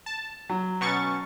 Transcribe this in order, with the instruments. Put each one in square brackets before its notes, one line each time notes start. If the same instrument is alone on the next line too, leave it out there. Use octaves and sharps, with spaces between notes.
[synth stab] A5
[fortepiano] F#3
[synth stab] B2 C#6 A6 [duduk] C#4